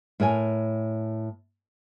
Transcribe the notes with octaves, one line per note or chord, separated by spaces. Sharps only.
A2 A#4 C#5 G#5